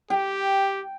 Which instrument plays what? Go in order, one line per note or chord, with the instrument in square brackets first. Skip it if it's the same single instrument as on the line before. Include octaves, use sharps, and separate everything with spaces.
[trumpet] G4 [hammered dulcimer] G5